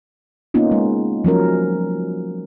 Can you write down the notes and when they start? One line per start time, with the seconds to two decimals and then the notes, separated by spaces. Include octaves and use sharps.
0.54 A#3 B3 C#4 D#4 F4
0.71 G#3
1.24 F3 F#3 C#4 A#4